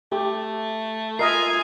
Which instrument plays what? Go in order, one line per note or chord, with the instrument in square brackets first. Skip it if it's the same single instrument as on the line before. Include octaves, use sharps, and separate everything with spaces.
[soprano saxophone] A3 [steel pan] G4
[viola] F4 G#5 [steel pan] A#4 D#5 E5 [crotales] D#6 C7